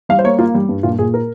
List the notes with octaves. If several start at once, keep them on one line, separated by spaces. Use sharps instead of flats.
G3 F5
C5
A#3 C#5
A#3 F4
G3
G2
A#2 F4
A#2 G#4
A#4